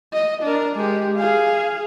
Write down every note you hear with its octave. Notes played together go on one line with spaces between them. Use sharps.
D#5
D4 A#4
G#3 G4
G#4 F5